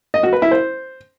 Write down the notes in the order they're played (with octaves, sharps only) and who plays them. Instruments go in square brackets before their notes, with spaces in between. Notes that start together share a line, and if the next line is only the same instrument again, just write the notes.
[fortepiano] D#5
F#4
B4
E4
C5